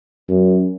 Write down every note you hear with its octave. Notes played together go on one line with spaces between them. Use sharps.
F#2